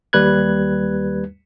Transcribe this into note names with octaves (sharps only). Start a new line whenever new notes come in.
D#2 G3 B4 F#6 G#6